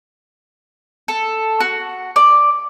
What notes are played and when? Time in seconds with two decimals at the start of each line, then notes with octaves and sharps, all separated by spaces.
1.08 A4
1.60 F#4
2.16 D5